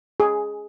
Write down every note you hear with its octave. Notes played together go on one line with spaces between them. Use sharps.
G#4